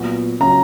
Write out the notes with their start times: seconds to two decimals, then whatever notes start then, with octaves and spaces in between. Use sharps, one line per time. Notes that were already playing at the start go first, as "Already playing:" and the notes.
Already playing: A#2 F#3 B3 F#4
0.40 C#3 F#3 C#4 A#5